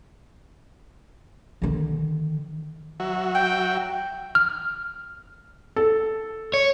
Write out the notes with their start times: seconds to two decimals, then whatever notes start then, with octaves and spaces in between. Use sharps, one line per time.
1.62 D3 D#3
3.00 F#3 F#4 E5
3.35 G5
4.35 F6
5.76 A4
6.54 C#5